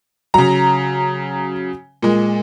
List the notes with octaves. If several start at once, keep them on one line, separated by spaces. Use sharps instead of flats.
C#3 F#3 A#5
A#2 G#3